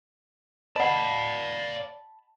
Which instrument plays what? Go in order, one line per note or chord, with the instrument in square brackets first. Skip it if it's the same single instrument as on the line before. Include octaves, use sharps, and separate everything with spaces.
[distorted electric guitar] D5 F5 [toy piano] D#5 F#5 [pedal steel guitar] A5 B5